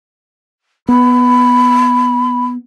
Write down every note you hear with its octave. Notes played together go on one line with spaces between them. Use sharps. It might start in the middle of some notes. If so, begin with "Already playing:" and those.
B3 B5